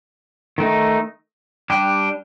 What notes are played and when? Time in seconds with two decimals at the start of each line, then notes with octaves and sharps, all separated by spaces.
0.58 D#3 A3 D#4
1.70 G3 D4 G4